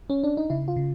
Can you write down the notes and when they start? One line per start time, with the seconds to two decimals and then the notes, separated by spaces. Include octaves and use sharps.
0.10 C#4
0.24 D4
0.37 D#4
0.50 C#3 E4
0.68 F4
0.76 C#3